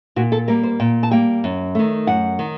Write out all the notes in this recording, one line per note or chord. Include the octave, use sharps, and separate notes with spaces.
A#2 F#4
A4
G3 A#3 A#4
C5
A#2 G5
A5
G3 A#3 G5
F#2
D#3 A3
F#2 F#5
D#3